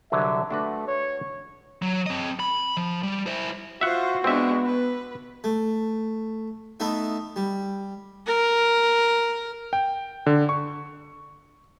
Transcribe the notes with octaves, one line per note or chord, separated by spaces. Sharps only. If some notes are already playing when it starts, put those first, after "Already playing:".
C2 D3 F#3 E5
A3 D4 F#4 B4
C#5
F#3
C4 D#5
B5
F3
G3
E4 C5
F4 F#4 C5 E5 F#5
G#3 B3 C4 D4 E5
B4
A3
A3 B3 D#4 E5
G3
A#4
G5
D3
C#6